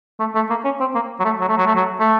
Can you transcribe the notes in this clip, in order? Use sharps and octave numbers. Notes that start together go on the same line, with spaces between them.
A3
A3
A#3
C#4
C4
A#3
F#3
A3
F#3
A3
F#3
A3
F#3
A3